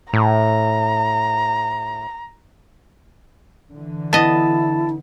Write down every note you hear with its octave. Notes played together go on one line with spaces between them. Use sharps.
A2 A#5
D3 E3
B3 E4 D#5 A5